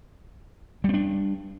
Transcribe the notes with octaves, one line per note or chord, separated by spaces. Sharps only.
G3 C4 D4